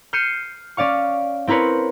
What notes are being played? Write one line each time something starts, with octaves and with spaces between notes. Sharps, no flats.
F6 G6 C7 C#7 D#7 E7
C#4 D5 F5 C#6
C4 E4 A#4 B4 C#5